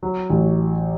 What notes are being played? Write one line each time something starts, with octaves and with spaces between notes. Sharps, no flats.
F#3
A1